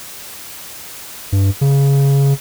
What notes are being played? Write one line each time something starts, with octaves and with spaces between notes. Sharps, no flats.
G2
C#3